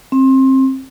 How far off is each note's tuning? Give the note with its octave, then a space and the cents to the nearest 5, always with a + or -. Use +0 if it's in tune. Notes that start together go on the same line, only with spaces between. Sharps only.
C4 +25